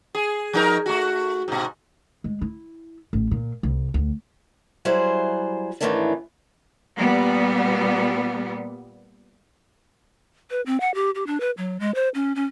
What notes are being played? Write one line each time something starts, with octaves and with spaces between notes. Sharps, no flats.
G#4
F3 D#4 A#4
A3 F#4
G#2 B2
G#3
E4
A1
A#2
C2
D2
F#3 G3 E4 G#4 C5
G#2 D#3 E3 A3 C#4 D4
A#2 G3 B3
B4
C4
F#5
G4
G4
D4
B4
F#3
G#3
C5
C#4
C#4